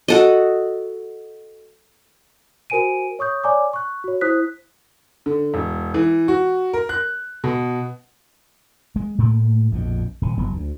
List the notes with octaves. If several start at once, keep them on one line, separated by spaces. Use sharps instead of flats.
F#4 A4 D#5
F#4 A#4 C5 G#5 D7 D#7
C#5 C#6 D#6 G6
C#5 D5 G#5 A#5 D6
C#6 F#6
F#4 C#5
E4 C5 D#6 F#6 B6
D3
E1
E3
F#4
A#4
F#6
B2
G#3
A2 A3 A#3
A#1 F2 B2
D#1 C3
F#1 F#3 B3
D2